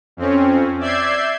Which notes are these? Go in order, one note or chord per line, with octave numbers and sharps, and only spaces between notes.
F2 C4 C#4
D5 E5 E6 G6 G#6 C7